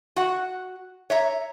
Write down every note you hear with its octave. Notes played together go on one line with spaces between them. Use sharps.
F#4 F#5
C#5 E5 A#5